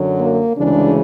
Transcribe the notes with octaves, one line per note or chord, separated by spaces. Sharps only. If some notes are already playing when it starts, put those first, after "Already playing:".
Already playing: F#2 D3 F#3
A#3
D2 C#3 E3 G#3 D4